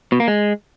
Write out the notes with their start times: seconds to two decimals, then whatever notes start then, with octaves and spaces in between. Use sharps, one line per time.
0.12 B2
0.20 A#3
0.28 G#3